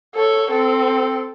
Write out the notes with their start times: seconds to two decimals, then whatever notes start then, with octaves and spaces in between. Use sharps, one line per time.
0.15 A4 C#5
0.50 C4 A4